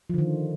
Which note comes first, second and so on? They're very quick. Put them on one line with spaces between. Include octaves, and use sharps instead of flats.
F3 D3 D#3